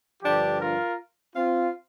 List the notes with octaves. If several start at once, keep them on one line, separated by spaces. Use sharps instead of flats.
G2 D3 F3 D4 G4
F4 A#4
C4 F4